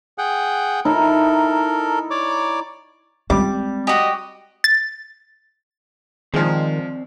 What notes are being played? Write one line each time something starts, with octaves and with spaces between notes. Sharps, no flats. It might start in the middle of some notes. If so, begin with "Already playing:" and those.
G#4 F#5 G5
D#4 E4 A4 A#4
C#5 D5 D6
G3 G#3 C4 D6
F#4 G4 D#5
A6
D#3 F3 G#3 C4 D5